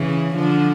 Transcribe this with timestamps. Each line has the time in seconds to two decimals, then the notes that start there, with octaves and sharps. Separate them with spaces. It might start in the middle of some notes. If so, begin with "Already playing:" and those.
Already playing: C#3 E3
0.34 D3 F3